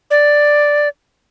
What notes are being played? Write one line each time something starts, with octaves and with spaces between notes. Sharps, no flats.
D5